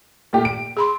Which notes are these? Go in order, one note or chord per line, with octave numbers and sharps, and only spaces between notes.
A#2 A3 G4
D7
G#4 B5 C6